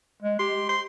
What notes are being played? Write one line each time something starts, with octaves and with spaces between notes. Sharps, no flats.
G#3
G4 C6
C6